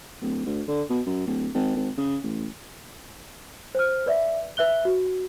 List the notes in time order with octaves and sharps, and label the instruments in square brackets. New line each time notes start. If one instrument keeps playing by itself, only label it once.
[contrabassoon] D1
D2
D3
B2
F#2
D1
G#1
G#1
C#3
A1
[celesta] C5 F6
B4 D5 E5
B4 E5 F#6 G7
F#4